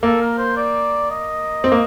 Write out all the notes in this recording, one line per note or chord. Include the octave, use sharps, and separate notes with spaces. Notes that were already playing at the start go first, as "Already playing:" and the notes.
A#3 A4
A#4
C5
D5
D#5
C4
A#3